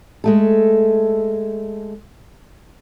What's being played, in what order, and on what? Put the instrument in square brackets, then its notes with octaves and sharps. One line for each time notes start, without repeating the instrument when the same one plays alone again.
[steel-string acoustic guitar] G#3 A3 A4